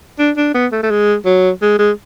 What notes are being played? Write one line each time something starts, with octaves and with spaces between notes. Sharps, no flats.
D4
D4
B3
A3
A3
G#3
F#3
G#3
G#3